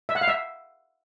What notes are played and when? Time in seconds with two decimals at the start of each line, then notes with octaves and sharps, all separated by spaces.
0.09 E5
0.15 F#5
0.21 F5
0.28 E5